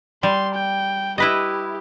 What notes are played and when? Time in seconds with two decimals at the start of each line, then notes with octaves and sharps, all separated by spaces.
0.23 G3 C6
0.54 G5
1.18 E4 G4 B4 D#5